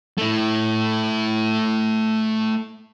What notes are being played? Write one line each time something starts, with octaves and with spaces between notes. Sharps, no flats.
A3 E4